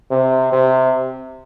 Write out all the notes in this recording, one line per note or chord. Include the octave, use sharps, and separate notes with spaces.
C3
C3